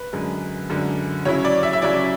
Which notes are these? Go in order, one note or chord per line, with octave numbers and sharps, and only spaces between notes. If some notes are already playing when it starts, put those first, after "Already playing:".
Already playing: B4
F#2 D3 G#3
F#2 D3 G#3
C#3 F#3 C#4 E4 C#5
D5
E5
E5
C#3 F#3 C#4 E4 D5